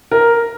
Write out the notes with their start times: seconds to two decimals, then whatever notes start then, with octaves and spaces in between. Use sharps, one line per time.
0.11 A#4